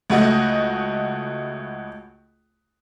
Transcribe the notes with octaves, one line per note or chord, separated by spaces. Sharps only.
C#2 A3 F#4 D#5